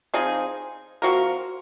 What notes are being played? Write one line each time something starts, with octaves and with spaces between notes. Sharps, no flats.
F3 C4 D#4 G#4
F3 C4 F#4 A#4